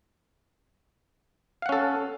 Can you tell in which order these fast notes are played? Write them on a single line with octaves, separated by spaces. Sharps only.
F5 F#5 C#4 A4